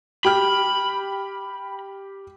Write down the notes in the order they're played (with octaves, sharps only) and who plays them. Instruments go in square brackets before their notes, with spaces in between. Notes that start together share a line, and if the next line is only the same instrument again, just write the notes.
[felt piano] G4 G5 F6 [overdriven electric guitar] B5